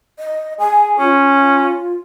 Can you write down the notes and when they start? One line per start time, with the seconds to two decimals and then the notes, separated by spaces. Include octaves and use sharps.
0.19 D#5
0.60 G#4 G#5
0.98 C#4 F4